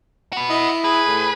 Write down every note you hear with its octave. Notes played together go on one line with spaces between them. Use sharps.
F#4 B4
E4 D#5
G#4 B4
A2